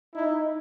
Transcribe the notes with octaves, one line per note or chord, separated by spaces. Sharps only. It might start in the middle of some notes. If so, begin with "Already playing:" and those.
D#4 E4